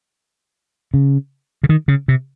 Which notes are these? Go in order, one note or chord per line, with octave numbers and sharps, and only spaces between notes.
C#3
C#3
D#3
C#3
C3